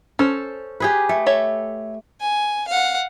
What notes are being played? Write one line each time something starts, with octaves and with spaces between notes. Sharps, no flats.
C#4 A4 C5
G4 G#4 B4
A3
A4 C#5 E5
G#5
F5 F#5